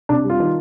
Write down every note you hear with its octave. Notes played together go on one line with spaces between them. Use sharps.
C3 D4
G3
F4
D#3